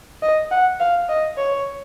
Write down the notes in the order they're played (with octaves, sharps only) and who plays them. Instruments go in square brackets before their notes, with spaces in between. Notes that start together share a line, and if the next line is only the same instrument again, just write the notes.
[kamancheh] D#5
F#5
F5
D#5
C#5